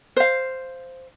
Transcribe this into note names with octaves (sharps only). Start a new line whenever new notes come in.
C5 F5